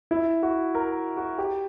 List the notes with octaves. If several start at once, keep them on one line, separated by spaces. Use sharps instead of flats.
E4
F#4
A#4
F#4
G4